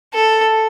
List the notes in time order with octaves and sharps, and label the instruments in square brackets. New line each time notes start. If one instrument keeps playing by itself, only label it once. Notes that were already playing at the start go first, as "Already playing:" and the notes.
[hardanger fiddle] A4